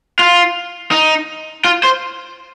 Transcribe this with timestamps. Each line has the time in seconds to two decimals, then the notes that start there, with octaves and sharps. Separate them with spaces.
0.19 F4
0.91 D#4
1.64 F4
1.83 C5